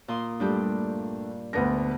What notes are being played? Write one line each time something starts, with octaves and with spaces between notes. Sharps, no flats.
A#2 C6 D#6
G2 G3 A3 D4 G4
D2 B3 D4 A#6